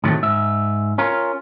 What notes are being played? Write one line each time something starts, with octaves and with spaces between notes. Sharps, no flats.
A2 C3 D#3 F#3 G#3 A3
G#2 E5
C#4 F4 A#4